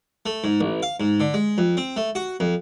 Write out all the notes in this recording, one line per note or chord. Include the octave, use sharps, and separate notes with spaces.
A3
G#2
A1
F5
G#2
D3
G#3
F2
C4
A3
F#4
F2